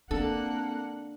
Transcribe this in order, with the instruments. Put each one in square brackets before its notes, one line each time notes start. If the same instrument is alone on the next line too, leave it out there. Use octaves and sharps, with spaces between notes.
[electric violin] A#3 F#5 [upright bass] C4 [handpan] D4 [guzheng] A4